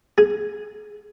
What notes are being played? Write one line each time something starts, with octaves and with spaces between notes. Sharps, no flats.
G#4